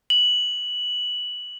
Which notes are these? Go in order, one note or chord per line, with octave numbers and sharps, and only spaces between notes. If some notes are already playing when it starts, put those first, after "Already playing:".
F#7